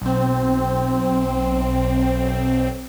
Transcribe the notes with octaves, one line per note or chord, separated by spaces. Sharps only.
B1 C4